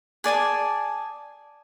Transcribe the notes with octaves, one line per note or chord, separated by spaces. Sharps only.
G#4 D5 G#5 A5